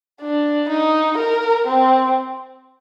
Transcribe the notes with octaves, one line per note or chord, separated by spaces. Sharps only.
D4
D#4
A#4
C4